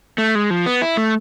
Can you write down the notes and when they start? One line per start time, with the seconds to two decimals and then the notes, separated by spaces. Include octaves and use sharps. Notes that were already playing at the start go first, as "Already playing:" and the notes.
0.18 A3
0.35 G#3
0.50 F3
0.66 B3
0.82 E4
0.97 A3